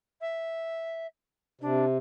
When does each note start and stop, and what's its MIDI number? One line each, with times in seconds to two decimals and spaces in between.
0.21 1.06 76
1.61 1.98 48
1.61 1.84 62